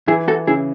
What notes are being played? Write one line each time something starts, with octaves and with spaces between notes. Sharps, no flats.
E3 E4 G#4
F#4 A4
C#3 E4 G#4